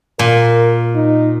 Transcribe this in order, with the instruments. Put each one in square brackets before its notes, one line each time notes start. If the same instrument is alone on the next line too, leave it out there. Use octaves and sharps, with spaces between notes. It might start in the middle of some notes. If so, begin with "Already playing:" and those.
[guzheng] A#2 [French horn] A#4
[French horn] D#4